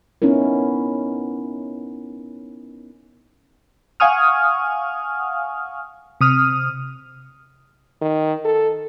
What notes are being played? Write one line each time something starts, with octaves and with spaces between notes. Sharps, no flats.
B3 C#4 D#4 E4 A#4
F5 F#5 G#5 C#6 D#6 F6
C3 D#6 F6
D#3
A4